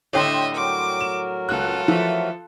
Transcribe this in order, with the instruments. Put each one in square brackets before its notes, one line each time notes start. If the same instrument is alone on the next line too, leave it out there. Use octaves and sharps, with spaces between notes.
[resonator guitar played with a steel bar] A2 D3 G3 [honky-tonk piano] C#5 G5 C6 [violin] D#5 E5
[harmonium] F#3 F#4 A#4 [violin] D6
[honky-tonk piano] E7
[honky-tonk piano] C#2 F#6 [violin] F4 A4
[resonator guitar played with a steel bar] E3 A3 [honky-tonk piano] F3